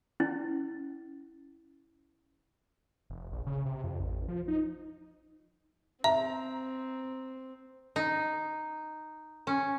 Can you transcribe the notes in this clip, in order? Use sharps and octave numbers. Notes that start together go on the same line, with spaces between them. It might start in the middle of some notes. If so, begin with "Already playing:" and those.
C#4 E4
F1
A#1
C#3
C3
F2
A1
F3
D#4
C4 E5 A#5
D#4
C#4